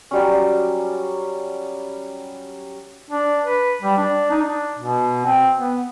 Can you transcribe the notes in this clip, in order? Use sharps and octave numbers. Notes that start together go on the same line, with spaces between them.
F#3 G3 C#4
D4
B4
G3
D4
D#4
D4
B2
C4
B3